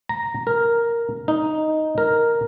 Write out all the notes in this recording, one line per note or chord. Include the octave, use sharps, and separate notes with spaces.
A#5
A#4
D#4
A#4